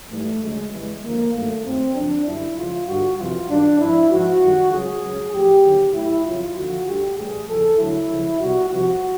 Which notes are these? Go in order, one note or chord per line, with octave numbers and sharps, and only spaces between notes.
G#2 E3 G3 A3
D2 C#3 F#3 G#3
E2 C#3 E3 G3 G#3
D#2 D3 F3 A#3
G2 D#3 F#3 A3
F#2 D#3 F#3 C4
F#2 C#3 F3 D4
F#2 D3 G3 E4
C#2 C#3 F3 F4
G2 D3 G3 F#4
F2 C3 E3 G3 F4
F#2 D#3 G3 D4
G#2 F3 E4
G#2 F3 F#4
F#2 D#3 G3
C#2 C#3 F#3 G#4
C#2 C#3 F#3
A2 F3 G4
D#2 D3 F#3
A2 F#3 E4
F2 C#3 F#3 F4
D#2 D3 F3 F#4
D2 D3 G3 G4
A2 E3 G3 G#4
E2 C#3 F3 A4
D2 D3 F#3 E4
C#2 C#3 F3
C2 B2 G3 F#4
C2 C3 F3 F#4